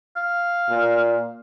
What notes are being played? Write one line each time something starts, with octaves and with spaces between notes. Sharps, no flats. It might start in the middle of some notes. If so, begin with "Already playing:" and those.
F5
A#2